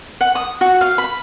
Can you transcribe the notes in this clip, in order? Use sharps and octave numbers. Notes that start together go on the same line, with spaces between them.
F#5
D#6
F#4
F5
B5